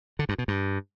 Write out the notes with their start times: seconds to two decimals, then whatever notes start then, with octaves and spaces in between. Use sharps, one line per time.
0.19 D3
0.29 G2
0.38 B2
0.48 G2